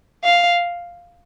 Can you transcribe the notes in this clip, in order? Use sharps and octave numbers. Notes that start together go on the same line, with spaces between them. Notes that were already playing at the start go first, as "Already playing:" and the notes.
F5